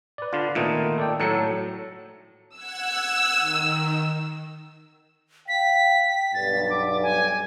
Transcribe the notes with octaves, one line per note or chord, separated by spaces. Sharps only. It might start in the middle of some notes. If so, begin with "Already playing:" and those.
B4 D5
D3 F4
A#2 D#3 A3 B3 D#4 F4
A4 D5 G5
A2 F#3 A4 A5 A#5 C#7
F#5 E6 F#6 G#6
D#3
F5 G5 B6
B1 G2 A6
D6
G#5